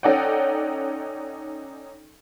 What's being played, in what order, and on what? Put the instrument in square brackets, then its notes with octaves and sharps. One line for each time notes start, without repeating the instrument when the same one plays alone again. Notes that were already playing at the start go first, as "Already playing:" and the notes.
[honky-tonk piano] C#4 D#4 A4 D5 F#5 G5